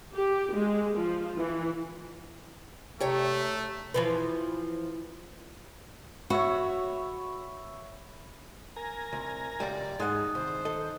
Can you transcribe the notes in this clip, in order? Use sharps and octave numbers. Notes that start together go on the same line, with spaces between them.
G4
G#3
F3
E3
C3 A3 G4 C#5 A#5
E3 F3 B4
F#4 C#5 E5 B5
A#4 G#5 A#5
C2
C#2 F#2 G3 D5
G#2 G#3 D#4 G#4 F#5 D#6 F#6
C2 D#3 C5
A4 D#5